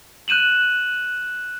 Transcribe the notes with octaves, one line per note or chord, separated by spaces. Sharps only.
F#6 G6 D#7 E7 F#7